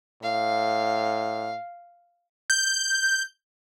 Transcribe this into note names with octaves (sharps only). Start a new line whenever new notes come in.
A2 F5
G6